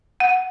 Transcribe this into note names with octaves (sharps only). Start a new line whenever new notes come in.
F#5